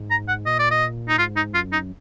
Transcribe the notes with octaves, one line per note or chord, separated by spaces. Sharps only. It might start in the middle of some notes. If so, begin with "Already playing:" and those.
Already playing: G#2
A#5
F#5
A#2 D#5
D5
D#5
D#4
G#2 F4
D#4
F#2 F4
D#4